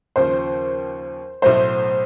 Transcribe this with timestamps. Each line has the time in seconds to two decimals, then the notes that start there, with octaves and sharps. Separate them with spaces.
0.16 D#2 C#3 F3 C5
1.42 B1 A2 F#3 A3 C5